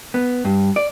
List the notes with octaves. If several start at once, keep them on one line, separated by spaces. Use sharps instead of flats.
B3
G2
D5